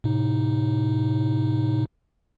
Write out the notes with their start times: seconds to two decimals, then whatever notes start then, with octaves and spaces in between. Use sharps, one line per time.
0.04 A2 C3 D#4